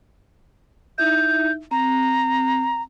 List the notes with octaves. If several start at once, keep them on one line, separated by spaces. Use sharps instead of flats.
D#4 E4 E5 G6
C4 A#5